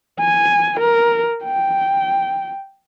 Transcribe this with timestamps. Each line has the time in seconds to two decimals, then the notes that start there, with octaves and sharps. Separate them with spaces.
0.19 G#5
0.80 A#4
1.44 G5